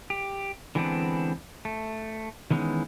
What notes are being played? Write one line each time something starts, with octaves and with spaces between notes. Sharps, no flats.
G4
D3 E3 G#3 B3 C4 D4
A3
D#3 E3 G#3 B3 C#4 D#4